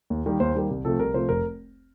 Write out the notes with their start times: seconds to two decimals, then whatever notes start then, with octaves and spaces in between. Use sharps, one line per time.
0.10 D#2
0.26 D#3 G3 A#3
0.40 D#2 C5
0.55 D#3 G3 A#3
0.70 C2
0.85 C3 F3 A3 A4
0.99 C2 A#4
1.14 C3 F3 A3 C5
1.29 F1 A#4